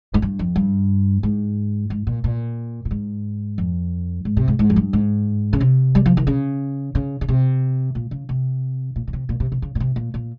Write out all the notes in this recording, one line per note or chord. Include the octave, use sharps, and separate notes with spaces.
G#2
G2
F2
G2
G#2
G#2
A#2
A#2
A#2
G#2
F2
G#2
C3
G#2
G#2
F2
G2
G#2
C#3
C3
G3
F3
D#3
C#3
C#3
C#3
C3
A#2
C#3
C3
A#2
C#3
C3
A#2
C3
C3
C#3
A#2
C3
A#2
A#2